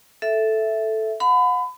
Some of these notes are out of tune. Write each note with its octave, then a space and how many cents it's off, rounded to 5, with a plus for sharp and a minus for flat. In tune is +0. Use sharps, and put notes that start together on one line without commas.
A4 -5 E5 +0
F#5 -35 B5 +30